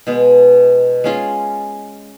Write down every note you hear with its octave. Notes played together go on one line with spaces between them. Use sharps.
B2 G#3 B3
G#3 C#4 F4 G#4